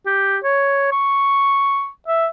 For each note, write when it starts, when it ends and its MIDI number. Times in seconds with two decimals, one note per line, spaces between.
0.06 0.37 67
0.44 0.88 73
0.92 1.89 85
2.08 2.28 76